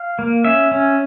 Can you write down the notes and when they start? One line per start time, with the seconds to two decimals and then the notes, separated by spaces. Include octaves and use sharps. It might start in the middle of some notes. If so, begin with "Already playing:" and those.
Already playing: F5
0.19 A#3
0.44 C#4 E5
0.72 C#4